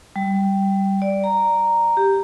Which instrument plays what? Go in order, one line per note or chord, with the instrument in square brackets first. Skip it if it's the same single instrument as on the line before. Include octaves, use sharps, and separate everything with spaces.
[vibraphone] G3
D5
A#5
G4